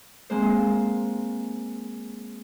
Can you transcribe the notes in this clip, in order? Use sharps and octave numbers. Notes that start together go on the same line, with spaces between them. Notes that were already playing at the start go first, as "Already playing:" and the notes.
G#3 A#3 C4 C5